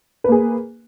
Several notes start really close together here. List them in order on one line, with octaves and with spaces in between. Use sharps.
B4 A#3 G#4